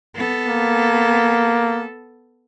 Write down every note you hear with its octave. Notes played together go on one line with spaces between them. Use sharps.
B3 A4
A#3